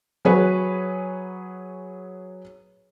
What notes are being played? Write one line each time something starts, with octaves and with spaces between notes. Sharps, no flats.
F#3 G#4 B4 C#5